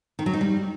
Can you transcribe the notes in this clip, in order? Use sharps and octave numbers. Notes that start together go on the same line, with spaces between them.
D#3
F#3
D#4
G3